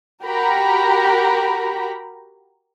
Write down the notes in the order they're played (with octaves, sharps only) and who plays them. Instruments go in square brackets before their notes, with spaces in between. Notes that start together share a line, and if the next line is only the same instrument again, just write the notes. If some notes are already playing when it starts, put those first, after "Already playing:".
[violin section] F#4 G4 A#4 A#5 B5